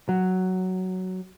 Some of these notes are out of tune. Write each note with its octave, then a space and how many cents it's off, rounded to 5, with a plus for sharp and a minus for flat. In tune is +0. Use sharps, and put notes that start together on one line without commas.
F#3 +5